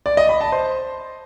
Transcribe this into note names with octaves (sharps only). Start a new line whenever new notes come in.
D5
D#5
B5
A5
C5